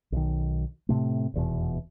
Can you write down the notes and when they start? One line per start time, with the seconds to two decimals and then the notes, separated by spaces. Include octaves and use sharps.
0.12 B1 D#3
0.89 A2 C3 A3
1.34 F1 E2 B2